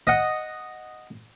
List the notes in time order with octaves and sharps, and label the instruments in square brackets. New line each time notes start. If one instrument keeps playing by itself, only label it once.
[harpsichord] D#5 F#5